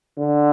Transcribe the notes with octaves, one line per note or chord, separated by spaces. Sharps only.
D3